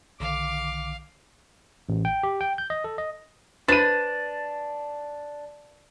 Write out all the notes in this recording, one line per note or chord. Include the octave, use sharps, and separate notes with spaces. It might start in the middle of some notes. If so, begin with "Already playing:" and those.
B1 D3 D#3 F5 D6
A1
G5
G4
G5
G6
D#5
A4
D#5
D4 B4 C5 B5 A6 D#7